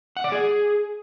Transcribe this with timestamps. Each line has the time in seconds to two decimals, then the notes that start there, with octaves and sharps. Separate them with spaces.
0.17 F#5
0.24 D5
0.32 G#4